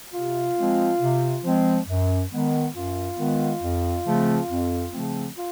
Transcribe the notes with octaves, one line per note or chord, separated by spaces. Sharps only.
C3 F4
F3 G#3 C4
C3
F3 G#3 C4
F#2
D#3 G#3 B3
F#2 F4
D#3 G#3 B3
F2
C#3 F3 A3 C4
F2
C#3 F3 A3 C4
F4